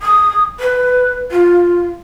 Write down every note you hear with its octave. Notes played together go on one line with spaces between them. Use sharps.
D#6
B4
F4